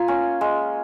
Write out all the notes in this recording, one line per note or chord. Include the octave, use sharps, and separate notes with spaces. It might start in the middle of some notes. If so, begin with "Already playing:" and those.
Already playing: A#3 F4 F5 G#5
C#4
G#3